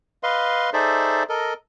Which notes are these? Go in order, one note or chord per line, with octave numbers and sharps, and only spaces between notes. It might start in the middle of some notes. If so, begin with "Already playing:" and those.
B4 D#5 F5 C6
D#4 G#4 A4 C5 D5 E5
A4 A#4 D#5